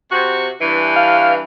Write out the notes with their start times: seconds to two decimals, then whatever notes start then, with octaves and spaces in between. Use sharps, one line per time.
0.12 C3 F#4
0.62 G2 E3
0.96 F5